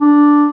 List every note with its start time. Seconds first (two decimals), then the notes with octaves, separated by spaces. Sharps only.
0.01 D4